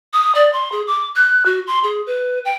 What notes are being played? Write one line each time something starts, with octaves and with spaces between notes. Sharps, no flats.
D#6
D5
C6
G#4
D6
F#6
F#4
C6
G#4
B4
G5